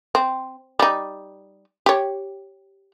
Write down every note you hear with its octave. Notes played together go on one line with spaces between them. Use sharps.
C4
G3 D#4
G4 C#5